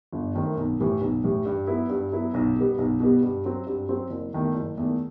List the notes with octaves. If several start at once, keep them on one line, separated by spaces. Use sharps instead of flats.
G1
F#2 D#3 A3 C4
B1
A2 E3 G3
B1
A2 E3 G3
G2
F#3 B3 E4
G2
F#3 B3 E4
B1
B2 G3 B3
B1
B2 G3 B3
G2
F#3 C4
G2
F#3 C4
F#1
E2 D#3 A3
F#1
E2 D#3 A3